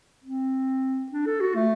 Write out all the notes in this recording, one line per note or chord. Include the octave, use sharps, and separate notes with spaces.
C4
D4
A4
F#4
A3